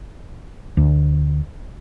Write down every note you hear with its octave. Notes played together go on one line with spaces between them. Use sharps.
D2